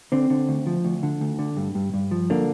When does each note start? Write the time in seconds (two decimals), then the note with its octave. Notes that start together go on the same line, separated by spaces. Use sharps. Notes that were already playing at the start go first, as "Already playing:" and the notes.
0.12 D3 C4
0.30 D3
0.49 D2
0.67 F3
0.85 D2
1.03 D3
1.21 D2
1.39 D3
1.57 G2
1.75 G2
1.94 G2
2.11 F3
2.30 D3 A#3